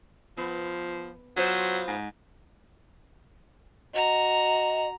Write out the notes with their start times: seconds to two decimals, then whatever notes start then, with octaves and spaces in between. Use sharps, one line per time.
0.37 F3 B3
1.36 F#3 B3 F4 C5
1.88 G#2
3.94 F#4 D#5 A#5